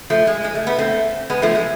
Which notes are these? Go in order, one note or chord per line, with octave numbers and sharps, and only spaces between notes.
F3 A3
G#3
G#3
A3
B3
A3 C4
G#3 B3
F3 A3
G#3